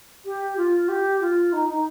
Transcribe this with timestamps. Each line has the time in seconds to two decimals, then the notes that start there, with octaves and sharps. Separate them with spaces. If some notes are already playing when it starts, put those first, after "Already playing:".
0.25 G4
0.57 F4
0.88 G4
1.21 F4
1.52 D#4
1.68 D#4